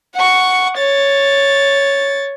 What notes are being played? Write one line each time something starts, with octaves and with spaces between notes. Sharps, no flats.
F#5 C#6
C#5 A6